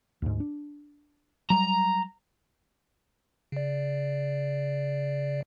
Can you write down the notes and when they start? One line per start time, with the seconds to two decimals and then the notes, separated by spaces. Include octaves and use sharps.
0.22 D2 G#2
0.40 D4
1.50 F#3 G3 A#5
3.52 C#3 D5